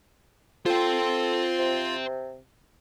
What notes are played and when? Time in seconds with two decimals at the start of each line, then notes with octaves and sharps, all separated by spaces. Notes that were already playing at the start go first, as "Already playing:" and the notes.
0.66 F4 A4 C5 G5
1.59 C3